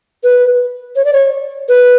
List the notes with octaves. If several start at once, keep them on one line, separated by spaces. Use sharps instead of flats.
B4
C#5
D5
C#5
B4